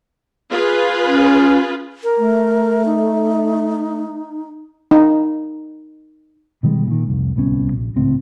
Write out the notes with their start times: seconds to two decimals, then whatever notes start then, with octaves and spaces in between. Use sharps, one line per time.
0.50 F4 G#4 B4
1.05 C#4
2.04 A#4
2.18 A3
2.86 D#4
4.91 D#4
6.63 B2 D#3 G3 G#3
6.87 A#2 D#3
7.07 F1 C2
7.36 D1 C2 B3 C#4
7.73 A#1
7.96 G#1 C#2 A2 C4